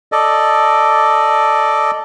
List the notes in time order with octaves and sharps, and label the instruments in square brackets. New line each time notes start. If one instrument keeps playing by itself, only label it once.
[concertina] A4 D5 D#5